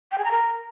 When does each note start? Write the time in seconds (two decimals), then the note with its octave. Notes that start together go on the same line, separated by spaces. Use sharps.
0.11 G5
0.18 G#4
0.24 A#5
0.31 A#4